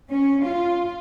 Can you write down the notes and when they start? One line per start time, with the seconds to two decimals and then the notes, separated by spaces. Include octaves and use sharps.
0.11 C#4
0.44 F4